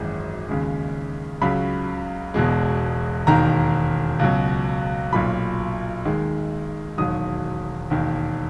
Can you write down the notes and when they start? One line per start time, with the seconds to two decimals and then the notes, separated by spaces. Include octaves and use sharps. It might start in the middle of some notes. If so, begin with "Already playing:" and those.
Already playing: G#1 F#2 E3 G#3
0.49 D#2 C#3 G#3
1.41 C#2 C#3 F#3 B5
2.34 E1 E2 B2 G#3
3.27 E1 D#2 D#3 A#5
4.19 C#2 B2 F#3
5.12 B1 A#2 F#3 B5
6.05 D#2 D#3 G#3
6.98 E1 D#2 D#3 F#3 D#6
7.90 E1 D#2 D#3